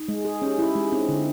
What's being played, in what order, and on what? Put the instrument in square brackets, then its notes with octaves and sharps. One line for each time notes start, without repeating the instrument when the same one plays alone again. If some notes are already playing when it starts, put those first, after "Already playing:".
Already playing: [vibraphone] D#4
[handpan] G#3
G#4
[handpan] C#4 [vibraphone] G4
[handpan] E4 [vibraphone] G4
[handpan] G#3 [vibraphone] G#4
[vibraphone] D#4
[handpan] C4 [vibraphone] D4
[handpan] D3